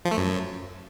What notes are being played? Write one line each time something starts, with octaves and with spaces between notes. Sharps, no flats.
F3
A3
F#2